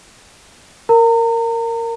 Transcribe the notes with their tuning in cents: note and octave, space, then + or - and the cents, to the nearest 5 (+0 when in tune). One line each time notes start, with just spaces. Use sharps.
A#4 -10 A#5 -35